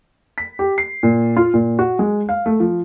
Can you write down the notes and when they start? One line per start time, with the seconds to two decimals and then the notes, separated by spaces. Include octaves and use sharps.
0.38 B6
0.59 G4
0.78 C7
1.03 A#2
1.36 F4
1.54 A#2
1.79 F#4
1.99 G#3
2.29 F5
2.46 A3
2.60 F3